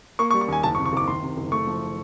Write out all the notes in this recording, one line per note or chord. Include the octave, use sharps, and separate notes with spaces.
A#3 C#6
C#6
G3
C#6
D#2 G#5
F#1 A5
C#6
C3
C#6
F#1 D6
D#3 C6
C3
F#1
A3 C#6
F3